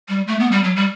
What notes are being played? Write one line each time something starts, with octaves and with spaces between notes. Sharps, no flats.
G3
A3
B3
G3
F#3
G3